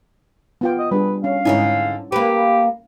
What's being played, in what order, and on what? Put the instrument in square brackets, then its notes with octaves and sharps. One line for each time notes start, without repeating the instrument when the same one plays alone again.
[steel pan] B3 F4 G5
[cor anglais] D#5
[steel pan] G3 D4 G#4 [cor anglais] B4
[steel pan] C#4 [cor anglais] F5
[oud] G#2 D3 G#4 [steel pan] C#4 D#4 E4
[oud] A#3 B4 [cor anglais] G4